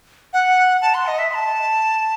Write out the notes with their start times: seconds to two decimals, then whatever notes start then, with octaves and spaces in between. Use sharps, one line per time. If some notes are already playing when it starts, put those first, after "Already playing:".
0.33 F#5
0.81 A5
0.94 C6
1.06 D#5
1.19 E5
1.30 C6
1.34 A5